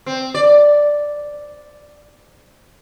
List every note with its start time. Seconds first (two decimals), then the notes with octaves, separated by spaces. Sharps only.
0.06 C4
0.35 D5